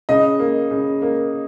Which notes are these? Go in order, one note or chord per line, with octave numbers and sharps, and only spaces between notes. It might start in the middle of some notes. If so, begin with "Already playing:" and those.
C#3 D#5
A#3
C#3
A#3